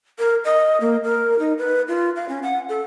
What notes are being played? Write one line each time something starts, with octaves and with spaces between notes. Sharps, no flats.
A#4
D#5
A#3
A#4
D#4
B4
F4
F5
C#4
F#5
A4